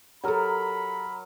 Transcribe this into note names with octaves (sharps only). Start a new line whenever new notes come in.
F#3 G4 A4 A#4 B5